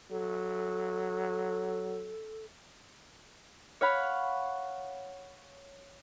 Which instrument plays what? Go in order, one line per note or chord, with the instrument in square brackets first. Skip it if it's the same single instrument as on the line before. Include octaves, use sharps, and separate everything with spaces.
[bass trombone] F#3 [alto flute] A4
[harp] C#5 F5 F#5 B5